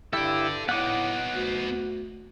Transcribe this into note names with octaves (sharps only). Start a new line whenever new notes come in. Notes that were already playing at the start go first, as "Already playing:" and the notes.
G2 E4 G4 A4 D5 E5
A2 B3 D#4 F#5 D6
D2